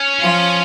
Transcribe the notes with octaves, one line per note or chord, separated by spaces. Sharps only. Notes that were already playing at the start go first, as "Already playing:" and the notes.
Already playing: C#4
F3 F4